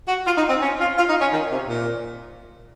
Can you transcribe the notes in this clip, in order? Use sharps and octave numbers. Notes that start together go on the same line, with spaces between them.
F#4
F4
D#4
C4
C#4
F4
F4
D#4
C#4
D#3
C3
A#2